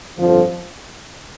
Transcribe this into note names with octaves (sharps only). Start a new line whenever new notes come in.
G1 F2 D3 F3